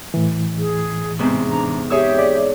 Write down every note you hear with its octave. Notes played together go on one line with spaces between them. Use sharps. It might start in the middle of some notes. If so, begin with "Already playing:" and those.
A2 E3
G#4
E2 G#2 C3
D4 A#5
G4 G#4 C#5 E5 E6
D5